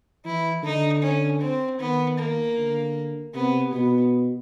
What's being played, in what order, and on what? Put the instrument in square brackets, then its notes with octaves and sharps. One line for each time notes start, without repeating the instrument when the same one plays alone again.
[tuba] E3 [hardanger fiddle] E4
[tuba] D3 [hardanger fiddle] D#4
[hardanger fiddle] C#4
C4
[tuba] D#3 [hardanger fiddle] B3
[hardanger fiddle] A#3
[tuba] D3
[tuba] C3 [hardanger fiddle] B3
[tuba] B2 [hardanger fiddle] B3